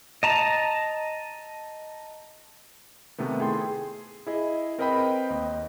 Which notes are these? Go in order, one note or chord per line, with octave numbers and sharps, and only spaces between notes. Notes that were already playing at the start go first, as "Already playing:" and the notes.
D#5 A5 A#5
C3 D#3 A3 B3
E4 G#4 A4 G5 C6
G#4
E4 G#4 D#5
C4 A#4 B4 D#5 G5 B5
D#2 D#5